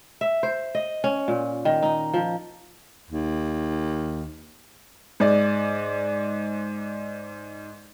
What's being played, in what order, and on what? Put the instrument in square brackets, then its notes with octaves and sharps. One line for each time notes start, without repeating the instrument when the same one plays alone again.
[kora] E5
C5
D#5
C#4
A#2
D#3
D#4
F3
[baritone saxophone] D#2
[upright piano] G#2 D5